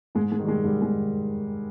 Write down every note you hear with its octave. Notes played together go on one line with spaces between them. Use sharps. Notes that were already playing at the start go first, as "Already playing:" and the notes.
G#2 G#3
G#3
D#3 G3
G#3
G#2 G3
G#3
D#3